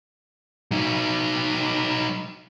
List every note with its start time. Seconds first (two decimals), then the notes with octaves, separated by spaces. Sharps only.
0.71 F#3 D#4